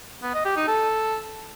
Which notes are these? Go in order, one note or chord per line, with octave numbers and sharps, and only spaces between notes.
B3
D#5
G4
D#4
A4